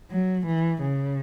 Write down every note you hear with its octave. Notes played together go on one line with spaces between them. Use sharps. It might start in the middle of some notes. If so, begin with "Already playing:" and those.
F#3
E3
C#3